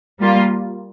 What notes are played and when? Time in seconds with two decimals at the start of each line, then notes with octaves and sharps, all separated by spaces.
0.20 G3 A#3 F4